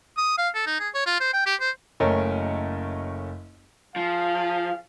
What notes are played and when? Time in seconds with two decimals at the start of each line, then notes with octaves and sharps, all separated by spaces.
0.17 D#6
0.38 F5
0.55 A4
0.67 D#4
0.80 G#4
0.95 C#5
1.06 F4
1.20 C5
1.33 G5
1.46 G4
1.61 C5
2.00 F#1 A3 C#4 A#4 D#5
3.96 F3 G#4 F5